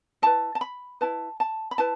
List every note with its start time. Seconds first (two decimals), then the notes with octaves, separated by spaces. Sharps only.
0.22 E4 B4 A5
0.55 A5
0.61 B5
1.01 E4 B4 A5
1.40 A5
1.71 B5
1.78 E4 B4 A5